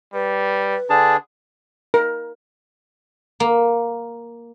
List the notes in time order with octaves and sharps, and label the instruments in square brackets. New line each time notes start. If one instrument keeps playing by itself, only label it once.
[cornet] G3 [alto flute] B4
[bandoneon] D3 D4 G#4 [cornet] A5
[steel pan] A#4
[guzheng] A#3